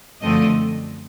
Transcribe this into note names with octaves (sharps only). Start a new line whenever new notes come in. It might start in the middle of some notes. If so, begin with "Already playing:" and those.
F#2 D3 F3 A3 C4 D#5